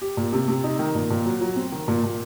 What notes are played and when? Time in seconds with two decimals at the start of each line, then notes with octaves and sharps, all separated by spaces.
0.02 G4
0.17 A#2
0.33 C3
0.48 C3
0.64 D#4
0.79 D#3
0.95 A#2
1.10 A#2
1.26 F#3
1.41 F#3
1.56 C4
1.72 D#3
1.88 A#2
2.03 A#2